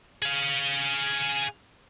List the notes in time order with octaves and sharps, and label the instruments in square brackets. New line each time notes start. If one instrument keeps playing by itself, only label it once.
[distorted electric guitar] G#4 F5